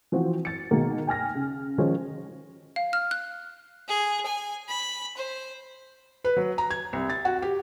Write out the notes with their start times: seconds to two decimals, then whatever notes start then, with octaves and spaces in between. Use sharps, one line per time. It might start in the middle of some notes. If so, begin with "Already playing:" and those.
0.12 E3 F3 C4 F#4
0.45 A6 C#7
0.71 B2 D#3 G#3 A#3
1.07 G5 G#5 F6 A#6
1.35 C#3
1.78 D#3 F3 G#3 C#4 C5
2.76 F5
2.93 F6
3.11 F#6
3.88 G#4
4.26 G#5
4.69 B5
5.17 C5
6.24 B4
6.37 F#3
6.58 A#5
6.71 G#6
6.93 C2
7.10 A6
7.25 F#4
7.42 G4